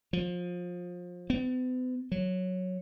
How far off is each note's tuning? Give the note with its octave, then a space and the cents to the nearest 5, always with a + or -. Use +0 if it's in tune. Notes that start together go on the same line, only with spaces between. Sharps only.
F3 +25
B3 +45
F#3 -5